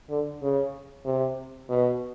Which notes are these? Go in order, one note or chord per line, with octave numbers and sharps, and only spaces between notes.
D3
C#3
C3
B2